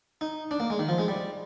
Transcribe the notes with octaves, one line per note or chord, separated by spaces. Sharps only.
D#4
D4
A#3
G#3
D#3
F3
G#3
G3